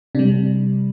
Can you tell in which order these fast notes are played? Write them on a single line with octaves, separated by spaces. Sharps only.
C3 D4 G3